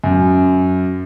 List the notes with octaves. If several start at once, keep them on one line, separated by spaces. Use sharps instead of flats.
F#2